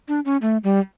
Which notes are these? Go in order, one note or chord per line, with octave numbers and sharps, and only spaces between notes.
D4
C#4
A3
G3